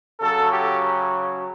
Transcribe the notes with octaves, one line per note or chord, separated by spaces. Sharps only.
C#3 F#3 A4
G4